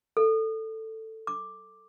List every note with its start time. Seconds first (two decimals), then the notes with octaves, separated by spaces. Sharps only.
0.17 A4
1.27 D6